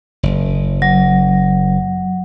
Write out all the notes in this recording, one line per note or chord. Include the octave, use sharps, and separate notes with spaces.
F#1
F#3